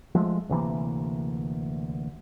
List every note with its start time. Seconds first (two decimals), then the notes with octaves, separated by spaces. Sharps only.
0.15 F3 G#3 A3
0.49 D2 C3 E3 A#3